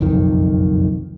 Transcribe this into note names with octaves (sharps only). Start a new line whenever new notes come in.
F#1 B1 F2 D#3